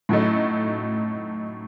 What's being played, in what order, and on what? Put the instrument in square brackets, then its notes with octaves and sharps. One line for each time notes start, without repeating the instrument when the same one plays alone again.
[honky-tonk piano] A2 F#3 A3 D#4